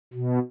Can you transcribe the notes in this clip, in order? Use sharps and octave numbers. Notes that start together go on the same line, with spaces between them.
B2